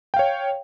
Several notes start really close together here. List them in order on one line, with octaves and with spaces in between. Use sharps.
G5 F5 C#5